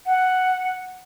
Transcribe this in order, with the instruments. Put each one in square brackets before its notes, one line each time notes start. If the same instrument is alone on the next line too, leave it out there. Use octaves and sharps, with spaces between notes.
[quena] F#5